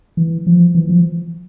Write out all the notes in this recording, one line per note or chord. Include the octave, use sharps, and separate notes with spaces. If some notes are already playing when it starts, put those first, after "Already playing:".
E3
F3
E3
F3